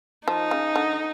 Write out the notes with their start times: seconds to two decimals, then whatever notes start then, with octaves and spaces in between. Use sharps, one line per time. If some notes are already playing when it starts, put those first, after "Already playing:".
0.28 F3 D#4
0.51 C#3
0.76 D3